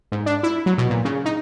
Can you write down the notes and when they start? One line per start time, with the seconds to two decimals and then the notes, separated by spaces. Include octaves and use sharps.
0.12 G#2
0.26 D4
0.43 E4
0.66 F#3
0.78 B2
0.90 A#2
1.05 C#3
1.25 D#4